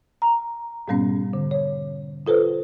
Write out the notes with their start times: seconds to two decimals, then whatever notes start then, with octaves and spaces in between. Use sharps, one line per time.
0.22 A#5
0.88 G#2 B2 G3 B3 C#4
1.33 D3
1.51 C#5
2.27 F4 A4 B4 C5